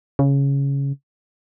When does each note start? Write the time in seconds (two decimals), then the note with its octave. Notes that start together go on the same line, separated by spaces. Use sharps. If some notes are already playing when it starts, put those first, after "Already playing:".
0.19 C#3